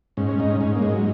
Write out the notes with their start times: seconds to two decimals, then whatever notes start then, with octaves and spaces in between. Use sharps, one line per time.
0.17 G#2 C#4
0.29 C#4
0.39 G#2 D#4
0.50 C#4
0.61 G#2 C#4
0.75 A#3
0.82 G#2 G#3
0.93 F#3